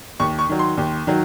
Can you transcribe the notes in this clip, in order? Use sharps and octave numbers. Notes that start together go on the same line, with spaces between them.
D#2 C#6
C#6
D#3 F#3
C6
D#2
D#3 F#3